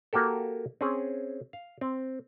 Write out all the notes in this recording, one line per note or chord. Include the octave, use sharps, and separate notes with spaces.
A#3 F#4 G4 A4
C4 C#4 G#4
F5
C4